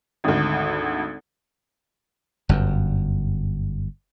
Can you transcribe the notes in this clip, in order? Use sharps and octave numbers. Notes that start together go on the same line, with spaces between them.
G#1 D2
G1 F#2